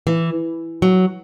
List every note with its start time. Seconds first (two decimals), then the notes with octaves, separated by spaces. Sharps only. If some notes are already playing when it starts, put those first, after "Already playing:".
0.07 E3
0.82 F#3